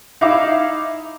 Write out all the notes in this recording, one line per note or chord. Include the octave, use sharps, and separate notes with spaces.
D#4 E4 E5 F5 D6